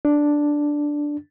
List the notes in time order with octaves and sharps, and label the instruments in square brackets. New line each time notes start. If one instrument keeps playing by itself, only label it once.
[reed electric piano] D4